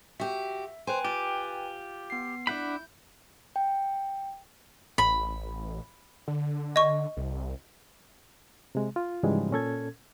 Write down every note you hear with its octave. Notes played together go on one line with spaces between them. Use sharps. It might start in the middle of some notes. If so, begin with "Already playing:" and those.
F#4 G4 E5
B4 C5 G5 G#5
F4 G4
B3 C7
D4 E4 F#5 B5 G6
G5
A1 B5
D3
D#5 C#6
C2
C3 G#3
F4
G#2 C#3 E3 F3 G3 G#3
A#2 C#4 A4 G#6